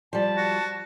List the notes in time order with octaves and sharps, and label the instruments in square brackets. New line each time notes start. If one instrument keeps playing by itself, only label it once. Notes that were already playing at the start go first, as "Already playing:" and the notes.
[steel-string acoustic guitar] F3 G3 [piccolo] A5
[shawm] F#4